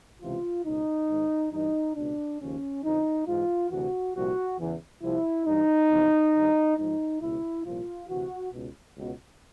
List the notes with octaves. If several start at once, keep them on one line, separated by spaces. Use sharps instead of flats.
C#2 C3 E3 F4
C#2 B2 D#4
G#2 D#3
G2 E3 D#4
C#2 B2 D4
D#2 C#3 F3 C#4
F2 D3 F3 D#4
G#2 E3 F4
D2 C3 E3 F#4
C2 A#2 F3 F#4
E2 C#3 E3
C2 C3 F3 E4
G2 E3 D#4
E2 C3 F3
G2 D#3
G#2 F3 D#4
C#2 B2 E4
C2 A#2 F3 F4
D2 C3 E3 F#4
C#2 B2
C#2 B2